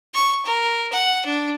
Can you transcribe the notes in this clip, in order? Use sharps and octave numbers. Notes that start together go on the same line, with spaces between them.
C#6
A#4
F#5
D4